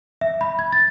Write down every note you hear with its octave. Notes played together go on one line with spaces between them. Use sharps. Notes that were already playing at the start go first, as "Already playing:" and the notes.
E5
B5
G#6
A6